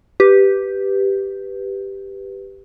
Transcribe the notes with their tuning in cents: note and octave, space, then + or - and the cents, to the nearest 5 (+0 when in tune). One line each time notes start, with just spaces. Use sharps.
G4 +0 B4 +0